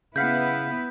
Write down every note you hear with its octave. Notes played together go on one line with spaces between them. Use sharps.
C#3 B3 E4 B4 F5 F#5 G6 B6